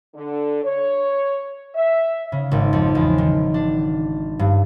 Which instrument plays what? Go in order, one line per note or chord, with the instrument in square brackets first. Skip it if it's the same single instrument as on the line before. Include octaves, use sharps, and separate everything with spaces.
[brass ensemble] D3
C#5
E5
[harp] C#3
G#1
F2
E2
D#3
D4
G2